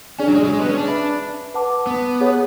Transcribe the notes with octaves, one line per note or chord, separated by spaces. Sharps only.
C#4 D4 G#4 D5 G#5
F#3
G#3
F#3
G#3
B3
C#4
D4
B4 E5 B5
B4 F#5 A5 D6
B3
G#4 C#5 F#5